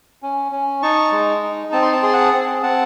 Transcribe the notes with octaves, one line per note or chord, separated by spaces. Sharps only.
C#4
C#4
D#4 A5 C#6
G#3
D#4
C4 A5
C6
A5
G#4 C6
F#5 A5
C4
C4 F#5 A5